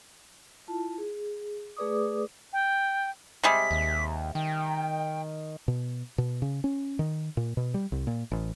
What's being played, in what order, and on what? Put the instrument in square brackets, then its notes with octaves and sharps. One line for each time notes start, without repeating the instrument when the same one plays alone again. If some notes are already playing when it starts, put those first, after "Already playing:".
[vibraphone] E4 F4 A5
G#4
A3 G#4 B4 D5 D6 D#6
[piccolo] G5
[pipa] C3 G3 G#3 [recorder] B6
[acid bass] D#2
[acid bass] D#3 [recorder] G5
[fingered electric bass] B2
B2
C#3
C#4
D#3
A#2
B2
G3
C2
A#2
A1